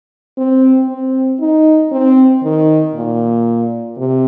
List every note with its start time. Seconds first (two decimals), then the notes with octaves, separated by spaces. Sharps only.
0.38 C4
0.89 C4
1.40 D#4
1.92 C4
2.44 D#3
2.95 A#2
3.98 C3